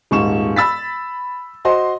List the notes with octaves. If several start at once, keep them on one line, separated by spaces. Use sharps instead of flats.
D#1 G#2 C#6 E7
B5 E6 A6 B6
F#4 C5 D#5 C6